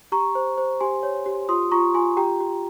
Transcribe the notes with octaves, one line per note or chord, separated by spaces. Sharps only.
G4 A#5 C#6
C5
C5
G4 G#5 C6
C#5
G4
F4 C6 D#6
F4 A#5 C#6
F4 G#5 C6
G4 G5 A#5
G4